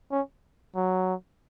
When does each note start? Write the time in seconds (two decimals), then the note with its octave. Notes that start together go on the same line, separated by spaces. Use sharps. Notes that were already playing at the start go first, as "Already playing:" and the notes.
0.12 C#4
0.76 F#3